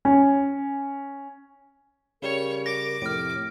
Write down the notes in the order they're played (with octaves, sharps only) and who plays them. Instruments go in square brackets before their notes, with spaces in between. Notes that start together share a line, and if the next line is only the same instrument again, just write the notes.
[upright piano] C#4
[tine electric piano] C#3 G3 [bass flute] A#4 [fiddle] C#5
[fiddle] D6 [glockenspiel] A#6
[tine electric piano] F2 A2 C3 [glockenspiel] F6 D7